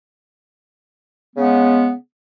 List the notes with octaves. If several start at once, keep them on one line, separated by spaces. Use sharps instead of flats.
C#3 G#3 B3